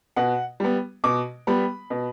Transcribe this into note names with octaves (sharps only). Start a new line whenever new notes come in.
B2 F#5
G3 B3
B2 D6
G3 B3 B5
B2